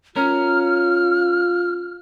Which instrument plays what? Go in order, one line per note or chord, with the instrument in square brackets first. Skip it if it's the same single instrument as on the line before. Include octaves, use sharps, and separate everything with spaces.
[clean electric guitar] C#4 A#4 [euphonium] F4 [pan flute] F6